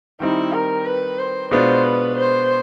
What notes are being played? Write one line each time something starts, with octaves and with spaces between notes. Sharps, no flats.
D#3 G3 C4 D#4 E4
A#4
B4
C5
B2 G#3 B3 D4 F4 C5
B4
C5